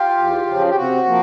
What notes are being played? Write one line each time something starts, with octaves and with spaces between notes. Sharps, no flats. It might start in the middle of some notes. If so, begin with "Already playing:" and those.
Already playing: F4 G4
E2
C#3 F3
G4
C3 F#4
F3 A#3